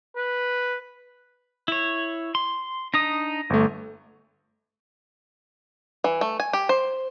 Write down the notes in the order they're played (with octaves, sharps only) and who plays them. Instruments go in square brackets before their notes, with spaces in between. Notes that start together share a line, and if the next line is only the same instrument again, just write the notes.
[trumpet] B4
[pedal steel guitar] E4 C#5
C6
[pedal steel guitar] D4 D#4 D#6 [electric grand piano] A#6
[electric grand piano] G1 A3
[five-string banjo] E3
A3
G#5
G4
C5